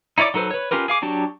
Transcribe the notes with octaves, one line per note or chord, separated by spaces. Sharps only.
D#4 E4 C#5 D5 D6
F#3 D#4 A4 B4 C5
B4 C#5
C#4 F4 G4 A#4 B4
G#4 F5 D6
F#3 D4 F#4 G4